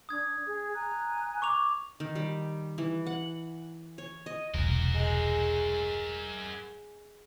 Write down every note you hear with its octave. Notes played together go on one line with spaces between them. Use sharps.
D4 D#6 G#6
G#4
G#5 A#5 F#6
C#6 D6 F7
D#3
G3
E3
F#5
C#5
D#5
E1 C2 F#4 A#4
G#3